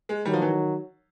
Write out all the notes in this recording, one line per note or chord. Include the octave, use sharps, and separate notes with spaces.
G#3
D#3 F#3 G3
F3
E3